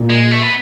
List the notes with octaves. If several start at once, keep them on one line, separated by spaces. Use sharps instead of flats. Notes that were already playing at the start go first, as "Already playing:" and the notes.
Already playing: A#2
G#3
A3
B3